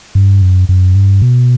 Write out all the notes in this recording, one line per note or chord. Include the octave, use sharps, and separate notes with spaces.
G2
F#2
F#2
G2
B2